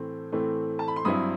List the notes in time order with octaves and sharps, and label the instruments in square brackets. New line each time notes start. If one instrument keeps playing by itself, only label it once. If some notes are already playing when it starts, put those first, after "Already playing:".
Already playing: [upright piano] A2 E3 A3 C4
A2 E3 A3 C4
A5
B5
C6
G2 F#3 C4 E4 B5 D#6